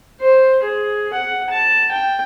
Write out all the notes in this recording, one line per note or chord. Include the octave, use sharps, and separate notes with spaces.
C5
G#4
F#5
A5
G5